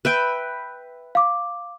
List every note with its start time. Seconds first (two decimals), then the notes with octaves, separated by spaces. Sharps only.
0.05 B4 E5 G5
1.15 F5 D6